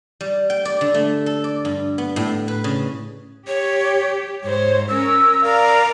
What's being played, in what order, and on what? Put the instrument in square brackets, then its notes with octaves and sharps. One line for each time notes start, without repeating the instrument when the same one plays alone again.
[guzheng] G3
G5
D5
D3
A3
A4
D5
G2
B3
A2
B4
C#3
[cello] G4 [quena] C#5
[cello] G#2 C5 [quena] C#5
[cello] C#4 A#4 [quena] E6
[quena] A#4 [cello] D5 F5